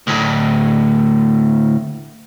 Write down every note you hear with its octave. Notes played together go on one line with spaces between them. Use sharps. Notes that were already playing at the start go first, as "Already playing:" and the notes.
D2 A2